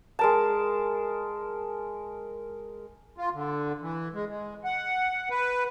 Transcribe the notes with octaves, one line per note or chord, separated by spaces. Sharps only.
G#3 A#4 A5
F4
D3
E3
G#3
G#3
F#5
B4